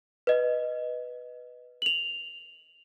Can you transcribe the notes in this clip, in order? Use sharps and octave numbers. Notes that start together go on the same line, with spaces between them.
B4 D#5
F7 F#7